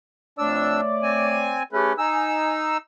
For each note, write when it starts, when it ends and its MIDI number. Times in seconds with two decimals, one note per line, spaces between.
0.39 0.81 41
0.39 1.60 57
0.39 0.81 62
0.39 1.60 73
0.39 1.60 74
0.39 0.81 88
1.03 1.63 60
1.03 1.63 80
1.73 1.93 57
1.73 1.93 61
1.73 1.92 67
1.73 1.92 68
1.73 1.92 71
1.98 2.77 63
1.98 2.53 80
1.98 2.77 88